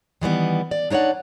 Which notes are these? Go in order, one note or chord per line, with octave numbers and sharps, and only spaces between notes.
D#3 E3 G3 B3
D5
D4 D#4 C#5 D5 F#5